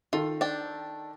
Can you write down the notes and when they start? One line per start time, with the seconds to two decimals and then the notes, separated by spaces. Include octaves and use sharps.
0.13 D#3 F4 A4
0.41 D4 G5